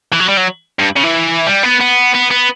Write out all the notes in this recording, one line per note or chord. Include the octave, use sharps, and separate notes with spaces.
E3
F#3
G3
F#3
G2
C#3
E3
G3
B3
B3
B3
B3